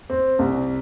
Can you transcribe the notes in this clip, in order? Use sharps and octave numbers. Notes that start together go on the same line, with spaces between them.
C4
C2